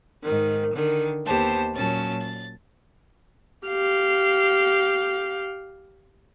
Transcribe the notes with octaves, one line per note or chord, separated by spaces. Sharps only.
G#2 D#3
D3 D#3
D#2 A#3 B3 G4 C5 A5
A#2 F#3 C#4 A5 A6
A6
G4 F5